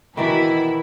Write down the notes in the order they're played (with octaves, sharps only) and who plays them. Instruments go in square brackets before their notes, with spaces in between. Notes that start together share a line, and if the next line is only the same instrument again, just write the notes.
[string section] B2 E4 B5 [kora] D#3 E3 D5